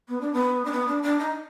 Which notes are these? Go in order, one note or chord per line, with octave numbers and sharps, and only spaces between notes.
B3
D4
B3
D4
B3
D4
D4
D#4